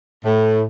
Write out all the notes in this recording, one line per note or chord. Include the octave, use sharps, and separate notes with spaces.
A2